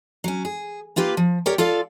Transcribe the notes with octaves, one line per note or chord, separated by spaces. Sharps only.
F#3 C#4
G#4
A#3 F4 G4 B4 F5
F3
G4 A#4 C#5 D5 G5
F4 A4 D5 F5